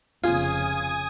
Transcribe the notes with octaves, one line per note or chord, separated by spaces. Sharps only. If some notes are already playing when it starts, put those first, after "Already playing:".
F1 C#3 F4 G#5 D#6 G#6